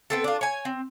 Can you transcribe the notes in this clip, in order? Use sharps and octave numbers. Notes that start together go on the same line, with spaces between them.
B3 C4 A4
D4 F4
C#5 G#5
C4